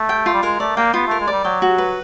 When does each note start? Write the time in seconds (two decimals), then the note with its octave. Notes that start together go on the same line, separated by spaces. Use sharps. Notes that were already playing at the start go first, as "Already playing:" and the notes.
Already playing: A3
0.09 G5
0.26 F4
0.34 G3
0.43 G#3 A#4
0.60 A3 D5
0.77 A#3 G5
0.94 B3 F4
1.07 A3 A#4
1.20 G#3
1.27 G3 D5
1.44 F#3 G5
1.62 F#4
1.78 B4